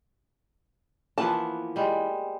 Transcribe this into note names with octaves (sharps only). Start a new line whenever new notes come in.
E3 F3 A#3 B3 A5
G3 G#3